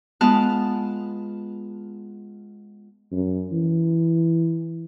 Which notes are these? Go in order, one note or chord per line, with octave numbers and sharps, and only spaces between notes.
G#3 B3 F4 A5 F6 F#6
F#2
E3